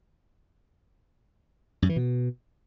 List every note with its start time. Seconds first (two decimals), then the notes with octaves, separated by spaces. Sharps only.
1.82 F#2
1.89 E3
1.96 B2